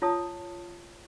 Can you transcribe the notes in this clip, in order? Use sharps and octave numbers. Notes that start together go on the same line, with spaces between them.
F4 C#5 A5 D#6